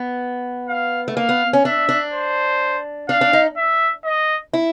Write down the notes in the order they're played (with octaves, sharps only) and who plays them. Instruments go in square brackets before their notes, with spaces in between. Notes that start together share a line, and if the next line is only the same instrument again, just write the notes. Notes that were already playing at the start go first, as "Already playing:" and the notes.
Already playing: [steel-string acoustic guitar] B3
[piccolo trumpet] F5
[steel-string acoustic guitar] A3
[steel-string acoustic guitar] A#3 [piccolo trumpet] F5
[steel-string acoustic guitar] B3
C#4
[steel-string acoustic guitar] D4 [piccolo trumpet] E5
[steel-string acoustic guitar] D4
[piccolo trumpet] C5
[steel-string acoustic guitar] D4 [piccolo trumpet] F5
[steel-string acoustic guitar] D4
D#4
[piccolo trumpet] E5
D#5
[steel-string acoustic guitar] E4